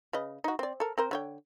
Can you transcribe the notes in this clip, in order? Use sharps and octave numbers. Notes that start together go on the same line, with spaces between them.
C#3 B4 D#5
D#4 F#4
C4 D5
A4 A#4
C4 A#4 C5
D3 C#5 G5